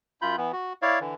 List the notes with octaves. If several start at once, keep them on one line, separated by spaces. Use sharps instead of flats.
F#2 F4 B5 G6
E3 B3
F#4
E4 C#5 D5 F5
D3 E3